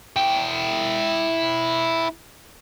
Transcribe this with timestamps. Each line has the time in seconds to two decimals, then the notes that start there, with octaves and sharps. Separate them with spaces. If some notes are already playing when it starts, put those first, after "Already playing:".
0.16 E4 G5